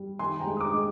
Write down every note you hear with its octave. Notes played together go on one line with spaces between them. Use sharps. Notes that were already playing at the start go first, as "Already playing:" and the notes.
Already playing: G3
D#3 G#5 C6
G5 A#5
G#3
D#6
A#5 D6
G#3